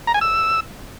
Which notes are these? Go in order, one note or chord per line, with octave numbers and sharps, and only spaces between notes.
A#5
G#5
E6